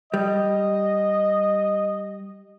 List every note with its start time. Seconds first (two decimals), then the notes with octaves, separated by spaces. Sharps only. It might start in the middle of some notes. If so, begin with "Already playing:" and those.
0.14 G3 D#5